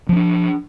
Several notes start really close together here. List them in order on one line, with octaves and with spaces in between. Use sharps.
F3 C#4 D4